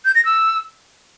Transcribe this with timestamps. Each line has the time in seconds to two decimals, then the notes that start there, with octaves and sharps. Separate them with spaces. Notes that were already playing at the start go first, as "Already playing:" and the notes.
0.05 G6
0.15 A#6
0.25 E6